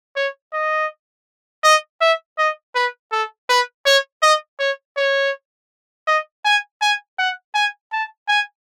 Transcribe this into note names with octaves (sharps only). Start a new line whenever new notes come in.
C#5
D#5
D#5
E5
D#5
B4
A4
B4
C#5
D#5
C#5
C#5
D#5
G#5
G#5
F#5
G#5
A5
G#5